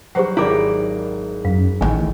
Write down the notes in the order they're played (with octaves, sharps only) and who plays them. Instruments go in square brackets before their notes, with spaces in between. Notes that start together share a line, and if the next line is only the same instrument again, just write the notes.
[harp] F#3 G3 [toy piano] G4 C5 F#5
[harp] G#1 G5 [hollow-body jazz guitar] E4 A#4 D5 [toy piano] A#5 D6
[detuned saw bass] F#2 [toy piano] F5
[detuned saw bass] A1 [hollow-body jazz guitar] D#2 A2 D#3 [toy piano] G#5